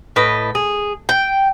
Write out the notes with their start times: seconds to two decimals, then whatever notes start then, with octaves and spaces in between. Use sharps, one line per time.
0.16 A2 B4 D#5
0.55 G#4
1.09 G5